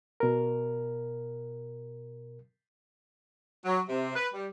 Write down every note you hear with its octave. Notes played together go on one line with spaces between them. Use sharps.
B2 A#4
F#3
C3
B4
G3